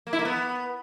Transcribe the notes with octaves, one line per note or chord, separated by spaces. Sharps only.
A#3
E4
A#3
B3